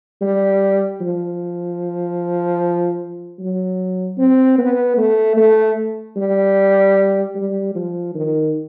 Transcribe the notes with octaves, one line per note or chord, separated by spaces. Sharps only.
G3
F3
F#3
C4
B3
A3
A3
G3
G3
F3
D#3